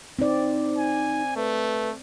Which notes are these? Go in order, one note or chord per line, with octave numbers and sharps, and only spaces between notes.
C4 D#4 D5
G#5
A3 B4